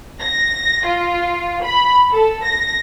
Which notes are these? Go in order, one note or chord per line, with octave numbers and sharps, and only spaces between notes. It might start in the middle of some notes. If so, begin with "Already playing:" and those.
A#6
F4
B5
A4
A#6